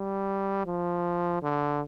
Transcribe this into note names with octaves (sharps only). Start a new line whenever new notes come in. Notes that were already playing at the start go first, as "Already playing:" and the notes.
Already playing: G3
F3
D3